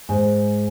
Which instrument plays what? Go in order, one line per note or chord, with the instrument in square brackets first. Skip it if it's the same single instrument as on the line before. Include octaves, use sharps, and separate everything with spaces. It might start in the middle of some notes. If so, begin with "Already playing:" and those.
[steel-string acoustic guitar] G#2